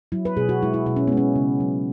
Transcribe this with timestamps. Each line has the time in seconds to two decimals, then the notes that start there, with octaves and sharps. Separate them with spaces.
0.12 F#3 E4
0.25 B4
0.37 B2 G#4
0.49 F#4
0.63 G#3 E4
0.74 E4
0.86 B2 E4
0.97 C#4
1.08 G#3 B3
1.17 C#4
1.35 C#3
1.60 F#3